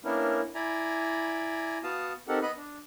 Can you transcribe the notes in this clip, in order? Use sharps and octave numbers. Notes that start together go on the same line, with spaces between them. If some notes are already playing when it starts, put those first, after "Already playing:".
A#3 B3 C#4 D4 E4 A#4
E4 D5 G#5 A#5 B5
B3 F#4 F5 A5 D#6
C4 D#4 G4 A4 A#4 F#5
B3 D#5 B5 F#6
D4